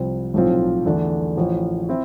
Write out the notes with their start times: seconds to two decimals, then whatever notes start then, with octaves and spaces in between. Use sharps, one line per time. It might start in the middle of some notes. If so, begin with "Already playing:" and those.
Already playing: C2 C3 F3
0.34 B1 A2 F3 C4 F4
0.86 E2 D3 A3 D4
1.37 A1 A2 F3
1.89 C4 E4